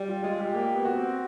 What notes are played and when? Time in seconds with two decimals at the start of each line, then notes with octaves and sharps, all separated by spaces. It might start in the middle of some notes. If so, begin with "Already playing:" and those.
Already playing: G3
0.09 F4
0.23 G#3 F4
0.39 G4
0.54 A#3 G4
0.75 B3
0.85 F#4
0.95 C4